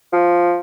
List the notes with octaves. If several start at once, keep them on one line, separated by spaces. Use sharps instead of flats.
F3